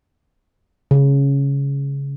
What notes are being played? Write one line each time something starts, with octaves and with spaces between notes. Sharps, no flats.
C#3